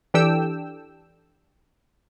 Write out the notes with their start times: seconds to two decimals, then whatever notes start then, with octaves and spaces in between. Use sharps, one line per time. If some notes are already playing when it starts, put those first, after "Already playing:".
0.14 E3 D4 G4 A4 G5 E6